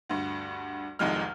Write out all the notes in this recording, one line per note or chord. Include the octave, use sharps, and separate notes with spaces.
D2 G2
F1 C2 F2 D#3 G#3 F6